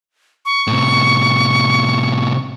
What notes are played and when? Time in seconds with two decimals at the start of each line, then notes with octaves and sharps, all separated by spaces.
0.45 C#6
0.67 A2 C3